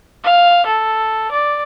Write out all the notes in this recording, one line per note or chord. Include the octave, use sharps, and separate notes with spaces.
F5
A4
D5